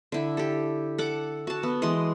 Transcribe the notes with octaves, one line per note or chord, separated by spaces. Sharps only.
D3 E4
G4 A4
A4 F#5 D6
F#4 A5
B3
E3 G#3 D#5 C6